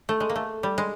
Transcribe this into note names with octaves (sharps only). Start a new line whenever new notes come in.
A3
G#3
A#3
A3
G3
G#3